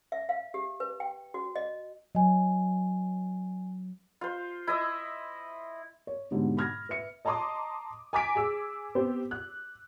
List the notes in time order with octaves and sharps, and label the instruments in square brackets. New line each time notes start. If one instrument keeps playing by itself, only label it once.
[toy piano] E5
F5
G4
B4
G5
F#4
D#5
[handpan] F#3 [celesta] D#5 G#5
[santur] F4 C5
E4 D#5 E5
[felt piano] C#5
G#2 B2 D3 G3 D#4
B5 F6 G#6 A#6
B4 E5 C#7
[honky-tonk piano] D#5 A5 A#5 C6 D6 D#6
G#5 A#5 D6 A6 B6 D7
G#4 E6
B3 C4 G4 C5
F#6